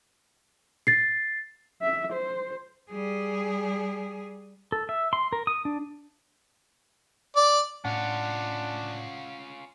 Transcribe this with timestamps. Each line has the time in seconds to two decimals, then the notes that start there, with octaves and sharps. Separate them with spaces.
0.87 A6 C7
1.82 E5
2.13 C5
2.91 G3 G#4
4.72 A4
4.89 E5
5.13 C6
5.33 A#4
5.47 D#6
5.65 D4
7.37 D5
7.85 A2 C#4 D4 F4 F#5